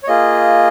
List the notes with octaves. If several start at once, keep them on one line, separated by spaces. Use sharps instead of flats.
C#5
A#3 F4 G#4 D#5